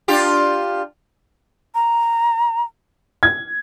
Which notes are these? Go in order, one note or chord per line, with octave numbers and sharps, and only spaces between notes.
D4 F4 G4
A#5
G#6